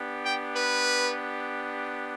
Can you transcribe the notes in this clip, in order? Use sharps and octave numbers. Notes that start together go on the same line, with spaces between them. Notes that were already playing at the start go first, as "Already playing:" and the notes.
Already playing: B3 D4 G4
G5
B4